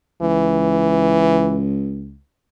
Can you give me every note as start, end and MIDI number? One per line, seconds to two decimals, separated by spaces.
0.22 2.20 37
0.22 1.65 52